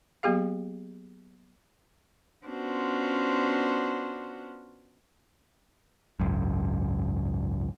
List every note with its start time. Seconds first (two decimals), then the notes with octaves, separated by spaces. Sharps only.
0.23 F#3 A#3 B3 G4 G#4 F5
2.45 B3 C#4 D4 F4 F#4 C5
6.20 G#1 C#2 F#2